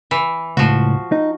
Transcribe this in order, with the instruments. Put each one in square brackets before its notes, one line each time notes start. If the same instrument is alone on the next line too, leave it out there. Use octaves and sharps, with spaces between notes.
[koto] E3
[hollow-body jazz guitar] C#2 A2 [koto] F3 F#4
[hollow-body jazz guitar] D#4